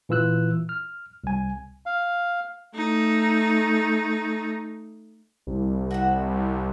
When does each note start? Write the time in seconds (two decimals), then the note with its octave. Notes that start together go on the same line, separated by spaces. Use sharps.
0.09 A#2 E3 F4 E6 F#6
0.69 F6
1.24 C2 G#5
1.86 F5
2.75 A3 D#4
5.47 C2
5.91 F#4 E5 F#5